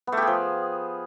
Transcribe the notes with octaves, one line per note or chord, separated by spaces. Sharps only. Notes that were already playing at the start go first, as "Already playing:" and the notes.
B3
A3
G4
G#4
F3